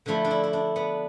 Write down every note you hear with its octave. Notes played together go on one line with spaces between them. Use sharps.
D3 F3 A3 E4
D4
E4
E4
D4
B3